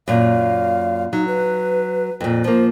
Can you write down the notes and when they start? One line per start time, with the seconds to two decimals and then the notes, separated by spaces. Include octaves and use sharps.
0.08 F#2 A#2 F5
1.13 F#3 D#4
1.28 B4
2.20 F2 A#2
2.44 F3 A#3 C5